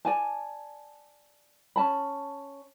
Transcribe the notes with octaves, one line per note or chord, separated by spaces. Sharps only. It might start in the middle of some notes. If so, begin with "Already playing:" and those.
D5 G#5 A5
C#4 A5 B5